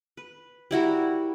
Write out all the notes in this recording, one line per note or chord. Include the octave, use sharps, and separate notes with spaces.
B4
G3 E4 F#4 A#4